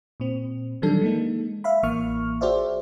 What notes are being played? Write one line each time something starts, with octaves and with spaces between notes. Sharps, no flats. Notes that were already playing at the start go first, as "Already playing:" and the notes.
A#2 C4
D#3 E3 F#3 G3 D4 A4
G#3 A#3 D#4
E5 F5 B5
A1 E3 A#3 C#6 F6
F#4 G#4 C5 D5 E5